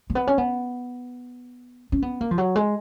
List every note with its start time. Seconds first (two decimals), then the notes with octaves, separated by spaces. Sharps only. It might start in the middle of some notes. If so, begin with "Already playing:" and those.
0.10 A#3
0.15 B3
0.27 C#4
0.38 B3
1.92 C#4
2.02 B3
2.21 A#3
2.31 F3
2.38 F#3
2.55 G#3